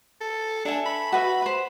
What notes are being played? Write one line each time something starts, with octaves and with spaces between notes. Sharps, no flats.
A4
D4 A4 E5 G#5
B5
F#4 B4 E5
B4 C5